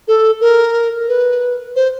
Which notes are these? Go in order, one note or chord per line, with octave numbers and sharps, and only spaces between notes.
A4
A#4
B4
C5